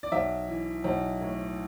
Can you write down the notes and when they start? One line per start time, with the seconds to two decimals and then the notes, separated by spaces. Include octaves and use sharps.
0.03 D5
0.12 B1 E5
0.48 E3
0.84 B1
1.21 A2